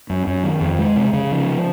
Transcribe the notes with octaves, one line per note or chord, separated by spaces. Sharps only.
F#2
F#2
D#3
F2
G#3
C3
C#3
F3